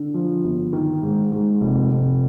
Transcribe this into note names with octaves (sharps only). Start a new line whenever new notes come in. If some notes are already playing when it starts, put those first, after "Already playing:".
Already playing: D3
F3
G1
D#3
G#2
G#2
F1
F1